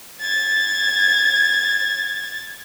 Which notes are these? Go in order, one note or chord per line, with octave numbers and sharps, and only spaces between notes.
G#6 A6